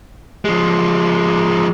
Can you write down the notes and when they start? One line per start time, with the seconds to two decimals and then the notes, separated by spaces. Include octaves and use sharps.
0.45 F3 G#3